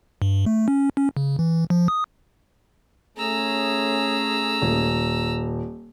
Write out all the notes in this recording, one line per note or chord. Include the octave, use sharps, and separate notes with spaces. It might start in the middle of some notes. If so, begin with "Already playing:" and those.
G2
A3
C#4
C#4
C#3
E3
F3
D#6
A3 C#4 G#4 A#5 E6
D#1